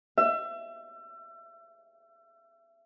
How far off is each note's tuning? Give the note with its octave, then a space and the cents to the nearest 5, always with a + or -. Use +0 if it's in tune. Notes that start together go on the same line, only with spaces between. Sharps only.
E5 +30